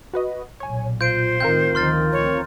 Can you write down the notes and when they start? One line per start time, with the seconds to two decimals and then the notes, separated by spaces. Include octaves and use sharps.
0.14 F#4 B4 D#5
0.60 B1 A#2 C#5 G#5
1.01 F4 C5 G6 D7
1.40 A2 D#3 C4 F4 A#4 G6
1.75 D2 D#3 F3 C6 F6 A6
2.12 C#5